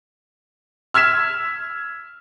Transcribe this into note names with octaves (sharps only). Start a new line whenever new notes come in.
E6 F6 G#6 B6 E7